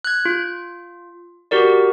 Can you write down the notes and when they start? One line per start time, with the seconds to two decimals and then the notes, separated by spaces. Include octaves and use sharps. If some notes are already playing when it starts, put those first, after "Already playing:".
0.05 F#6 G#6
0.25 F4
1.51 F#4 G4 A#4 D5